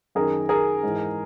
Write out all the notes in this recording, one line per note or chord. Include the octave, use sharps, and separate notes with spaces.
F#2 D#3 G#4 A#4
G#4 A#4
G#2 E3